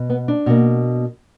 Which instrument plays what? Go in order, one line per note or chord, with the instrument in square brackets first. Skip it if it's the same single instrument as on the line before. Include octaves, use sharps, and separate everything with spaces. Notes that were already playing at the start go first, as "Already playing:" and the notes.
Already playing: [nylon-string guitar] B2
B3
D4
B2 A#3